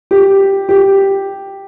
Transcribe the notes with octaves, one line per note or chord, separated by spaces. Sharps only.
G4
G4